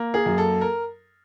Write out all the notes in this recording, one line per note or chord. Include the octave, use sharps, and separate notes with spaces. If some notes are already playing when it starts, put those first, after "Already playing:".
Already playing: A#3
G#4
F#2
A4
A#4